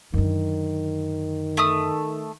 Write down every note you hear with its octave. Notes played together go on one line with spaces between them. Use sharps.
F#2 D3 D#3
A3 D#6